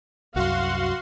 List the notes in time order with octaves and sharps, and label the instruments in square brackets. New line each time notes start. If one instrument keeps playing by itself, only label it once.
[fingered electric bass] C2 F#2 [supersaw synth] F#4 C6 [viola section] F5 F#5